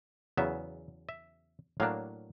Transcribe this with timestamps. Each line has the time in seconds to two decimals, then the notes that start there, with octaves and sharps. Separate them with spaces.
0.37 E2 C#3 F#3 B3 E5
1.09 E5
1.80 A2 F#3 A#3 D4 F5